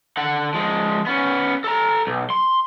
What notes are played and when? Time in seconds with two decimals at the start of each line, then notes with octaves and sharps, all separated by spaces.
0.17 D3 F#5
0.54 F3 G#3
1.06 B3 C#4
1.64 A4 A#5
2.07 B1
2.30 C6